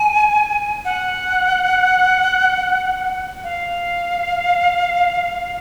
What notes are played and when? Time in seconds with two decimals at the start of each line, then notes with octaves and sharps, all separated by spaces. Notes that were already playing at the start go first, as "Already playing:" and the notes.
Already playing: G#5
0.85 F#5
3.44 F5